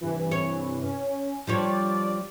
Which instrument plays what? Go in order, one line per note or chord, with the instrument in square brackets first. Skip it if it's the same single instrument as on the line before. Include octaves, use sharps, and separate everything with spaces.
[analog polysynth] G2 C3 E3
[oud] C#5
[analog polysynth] C#4
[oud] F3 G3 C#5 [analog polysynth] D4 D5